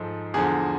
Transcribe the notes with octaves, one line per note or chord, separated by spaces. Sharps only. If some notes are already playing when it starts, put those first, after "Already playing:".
Already playing: G#2 F3 G#3 A4
E2 D3 F3 G#4